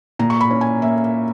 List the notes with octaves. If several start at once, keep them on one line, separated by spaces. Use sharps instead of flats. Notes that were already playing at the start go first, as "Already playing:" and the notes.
A#2 A#5
C#6
B5
C#4
G#5
A#3 E5